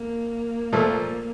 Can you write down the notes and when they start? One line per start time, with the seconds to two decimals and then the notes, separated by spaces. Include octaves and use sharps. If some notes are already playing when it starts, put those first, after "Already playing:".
Already playing: A#3
0.73 A#2 F3 A3